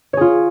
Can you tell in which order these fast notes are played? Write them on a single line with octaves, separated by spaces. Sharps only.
C#5 G#4 F4